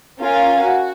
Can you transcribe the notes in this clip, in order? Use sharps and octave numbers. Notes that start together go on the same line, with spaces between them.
C#4 F4 A#4 F5 G#5
F#4